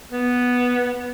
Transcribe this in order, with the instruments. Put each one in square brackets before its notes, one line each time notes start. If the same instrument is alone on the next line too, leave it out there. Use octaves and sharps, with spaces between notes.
[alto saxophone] B3